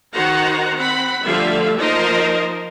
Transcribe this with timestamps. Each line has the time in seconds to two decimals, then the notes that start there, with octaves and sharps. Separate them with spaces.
0.13 D#3 D#4 F#4 C5 F#5 A#5
0.76 C4 F#5 B5
1.24 D3 F3 G3 A3 E5 F5
1.77 F3 A#3 D#4 A#4 C5 D#5